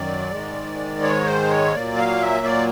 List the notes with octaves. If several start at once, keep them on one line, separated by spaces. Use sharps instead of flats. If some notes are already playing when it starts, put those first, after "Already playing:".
Already playing: F#2 D#3 F#3 D5
G#2 D#3 G#3
C#5
C5
C#5
A#2 F#3 A#3 D5
F5
E5
D5